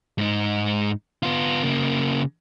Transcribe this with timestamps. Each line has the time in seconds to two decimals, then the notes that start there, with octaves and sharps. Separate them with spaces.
0.18 G#2 D#4
1.23 B3 F4
1.63 C#3 A#3